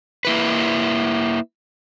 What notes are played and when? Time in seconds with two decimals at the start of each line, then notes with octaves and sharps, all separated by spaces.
0.25 A#3 E4 B4